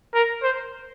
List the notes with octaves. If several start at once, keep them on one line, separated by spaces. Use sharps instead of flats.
A#4
C5